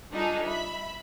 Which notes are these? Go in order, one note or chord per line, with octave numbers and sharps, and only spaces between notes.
G3 D4 D#4 F4 G#4 A4
E5 B5